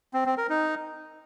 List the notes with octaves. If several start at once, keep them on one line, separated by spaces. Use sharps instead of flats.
C4
C4
A#4
D#4